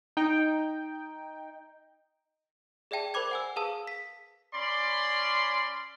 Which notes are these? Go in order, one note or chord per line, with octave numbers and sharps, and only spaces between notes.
D#4 G5
G#4 D5 E5 G5 A5
A#4 C5 B5 D6 G#6
F#5 G#5 E6
G#4 B4 F5 A5 D#6 E6
B6
C#4 D5 B5 C6